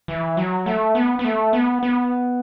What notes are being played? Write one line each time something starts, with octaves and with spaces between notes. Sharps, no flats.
E3
F#3
A3
B3
B3
A3
B3
B3